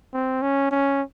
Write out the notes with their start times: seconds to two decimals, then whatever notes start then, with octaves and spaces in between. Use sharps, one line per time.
0.14 C4
0.42 C#4
0.71 C#4